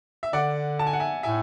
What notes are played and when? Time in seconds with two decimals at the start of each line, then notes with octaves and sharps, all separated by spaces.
0.23 E5
0.33 D3 D5 F#5
0.79 A5
0.87 G#5
0.93 F#5
1.00 E5 G#5
1.23 A2 E5 G#5